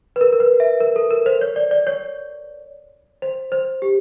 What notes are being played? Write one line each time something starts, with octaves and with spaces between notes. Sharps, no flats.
B4
A#4
A#4
B4
E5
A#4
A4
A#4
C5
C#5
D5
D5
C#5
C5
C5
G4